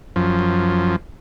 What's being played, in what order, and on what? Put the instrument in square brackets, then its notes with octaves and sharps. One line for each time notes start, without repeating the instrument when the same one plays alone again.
[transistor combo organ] F#2 F3